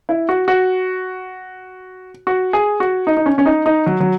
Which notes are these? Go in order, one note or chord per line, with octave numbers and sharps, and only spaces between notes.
E4
F#4
F#4
F#4
G#4
F#4
D#4
D#4
C#4
C#4
D#4
D#4
F#3
F#3